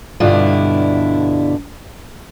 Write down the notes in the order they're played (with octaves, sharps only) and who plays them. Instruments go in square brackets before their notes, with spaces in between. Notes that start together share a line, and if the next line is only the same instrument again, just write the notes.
[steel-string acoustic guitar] G2 B2 D3 D4 E4 F4